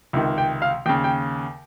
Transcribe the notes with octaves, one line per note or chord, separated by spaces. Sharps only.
C#2 C3 D#3
G5
F5
D#2 C#3 G5
G5